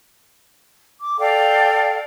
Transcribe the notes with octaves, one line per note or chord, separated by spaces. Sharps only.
D6
A4 D5 F5 G5